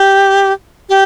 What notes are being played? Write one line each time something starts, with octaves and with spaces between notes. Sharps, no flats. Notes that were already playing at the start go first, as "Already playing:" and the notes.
Already playing: G4
G4